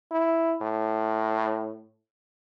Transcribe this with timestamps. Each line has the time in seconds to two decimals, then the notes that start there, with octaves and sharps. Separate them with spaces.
0.11 E4
0.61 A2